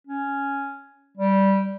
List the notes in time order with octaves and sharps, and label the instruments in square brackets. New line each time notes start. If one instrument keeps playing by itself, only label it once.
[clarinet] C#4
G3